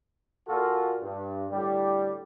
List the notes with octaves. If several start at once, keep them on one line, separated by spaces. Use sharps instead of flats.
A#2 F4 F#4 A4
G2
A2 D3 G3